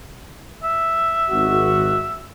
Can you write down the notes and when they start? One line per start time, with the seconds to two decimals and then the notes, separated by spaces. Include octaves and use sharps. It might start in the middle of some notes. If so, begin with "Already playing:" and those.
0.63 E5
1.30 G#1 F#4